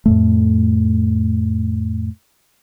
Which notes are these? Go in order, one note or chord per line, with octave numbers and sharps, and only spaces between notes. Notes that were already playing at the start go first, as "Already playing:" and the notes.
F2 A2 A3